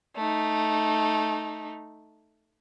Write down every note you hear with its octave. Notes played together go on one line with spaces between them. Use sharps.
A3 D#4